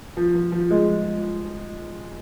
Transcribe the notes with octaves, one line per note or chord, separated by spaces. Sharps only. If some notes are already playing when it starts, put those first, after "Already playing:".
F3
F3
F3
G#3